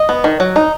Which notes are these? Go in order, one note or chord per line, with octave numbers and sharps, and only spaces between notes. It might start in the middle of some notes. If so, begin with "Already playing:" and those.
Already playing: D#5
B3
D#3
F#3
D#4